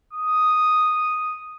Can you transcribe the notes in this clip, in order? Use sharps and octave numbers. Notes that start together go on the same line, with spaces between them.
D#6